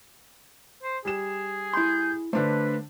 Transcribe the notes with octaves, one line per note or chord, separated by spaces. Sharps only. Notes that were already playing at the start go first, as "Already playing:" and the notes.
C5
G3 G#4 E7
E4 C6 G6
D3 A3 D4 B4 C5